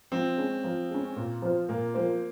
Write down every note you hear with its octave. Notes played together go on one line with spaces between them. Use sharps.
F3 C4
G#3 C#4
F3
G#3 C#4
A#2
F3 C4 F4 C5
A#2 A#3
F3 A#3 C4 F4 C5